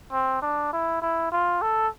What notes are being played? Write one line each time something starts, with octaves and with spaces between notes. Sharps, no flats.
C4
D4
E4
E4
F4
A4